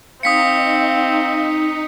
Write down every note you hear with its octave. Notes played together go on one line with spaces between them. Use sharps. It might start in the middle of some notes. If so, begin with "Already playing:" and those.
C4 D#4 F5 D#6 B6 C#7